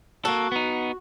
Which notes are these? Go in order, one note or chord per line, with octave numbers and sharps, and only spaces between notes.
A#3 F#4 A4
B3 D#4